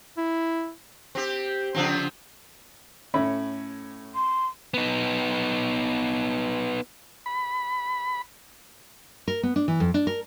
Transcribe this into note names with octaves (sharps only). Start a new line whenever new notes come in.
E4
C4 G4
C#3 F3 C4
A2 C#4 B5
C6
B3 D#4
B5
A#4
B3
D4
E3
F2
D4
A#4